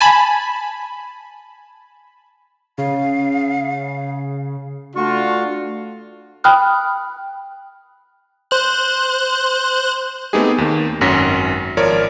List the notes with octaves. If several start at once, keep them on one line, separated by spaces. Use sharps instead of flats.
G#5 A5 B5
C#3 F5
A3 D4 F4 F#4 C#6
G5 B5 D#6 F6 F#6
C5 F#6
A3 B3 C4 D#4 G4 G#4
D#2 D#3
G#1 F#2 C#4 F#4 A#6 B6
G#1 F3 A#4 C#5 D5